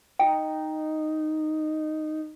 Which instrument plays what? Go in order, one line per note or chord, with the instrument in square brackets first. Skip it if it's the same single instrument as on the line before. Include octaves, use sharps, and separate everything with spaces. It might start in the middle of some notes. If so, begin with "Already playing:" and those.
[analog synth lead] D#4 [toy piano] G5